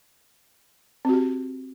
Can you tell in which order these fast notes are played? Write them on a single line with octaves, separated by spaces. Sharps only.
C4 F#4 G4